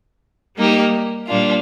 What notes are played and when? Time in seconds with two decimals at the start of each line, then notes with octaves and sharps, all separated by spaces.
0.56 G3 A#3 D#4 G4
1.27 A#2 G3 A#3 D4 F4